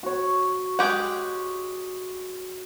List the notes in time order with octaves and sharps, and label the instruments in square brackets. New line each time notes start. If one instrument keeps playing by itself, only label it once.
[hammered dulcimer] F#4 C#5
[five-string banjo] G#3 G4 F#5